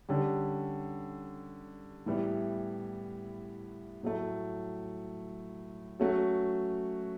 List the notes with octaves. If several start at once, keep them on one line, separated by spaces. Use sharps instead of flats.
D3 G3 C#4 G4
A2 E3 G3 B3 E4
A2 F#3 A3
F#3 A3 C#4 F#4